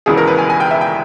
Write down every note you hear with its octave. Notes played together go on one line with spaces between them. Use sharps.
E1 D#2 C#3 E3 G#4
A#4
B4
G#5
G#5
G5
E5
G5